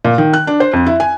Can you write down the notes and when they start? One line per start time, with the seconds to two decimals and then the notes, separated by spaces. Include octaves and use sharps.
0.05 A#2
0.18 D#3
0.33 F#6
0.47 D4
0.60 C5
0.73 F2
0.86 E4
1.00 G#5